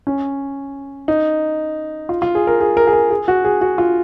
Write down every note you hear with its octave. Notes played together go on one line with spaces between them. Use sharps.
C#4
D#4
F4
F4
G#4
A#4
G#4
A#4
G#4
A#4
G#4
F#4
G#4
F#4
F4